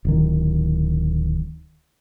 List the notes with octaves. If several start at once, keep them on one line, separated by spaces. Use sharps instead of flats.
D1 D#3